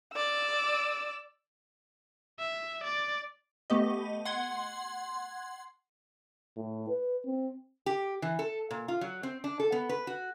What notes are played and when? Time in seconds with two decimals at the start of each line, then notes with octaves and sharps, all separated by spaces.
0.14 D5 E6
2.39 E5
2.84 D5
3.70 A3 B3 G4 D#5
4.25 F#5 C6 G#6
6.56 A2
6.89 B4
7.26 C4
7.86 G4
8.22 E3
8.39 A4
8.71 A#2
8.88 F4
9.01 F#3
9.23 C4
9.44 D4
9.60 A4
9.72 B3
9.89 B4
10.07 F#4